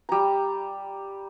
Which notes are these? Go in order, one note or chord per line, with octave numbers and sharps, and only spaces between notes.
G3 A#5